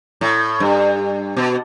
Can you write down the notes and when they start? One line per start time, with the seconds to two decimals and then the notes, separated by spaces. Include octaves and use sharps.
0.21 A2
0.60 G2
1.37 B2